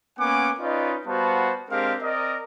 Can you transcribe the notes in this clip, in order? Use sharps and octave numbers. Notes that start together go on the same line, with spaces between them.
A#3 B3 C#4 F#5 G#5 D6
C#4 D#4 F4 B4 D5 D#5
G3 B3 F#4 C5 F5 A5
G#3 C4 D4 G4 A#4 F5
C4 A#4 D5 D#5